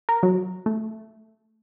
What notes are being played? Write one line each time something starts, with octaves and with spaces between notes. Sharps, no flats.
A#4
F#3
A3